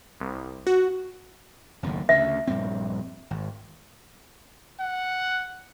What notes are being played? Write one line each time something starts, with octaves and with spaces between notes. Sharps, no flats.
C2
F#4
F#1 D#2 A2
D2 C#3 E5
A#1 G2 C4
G#1
F#5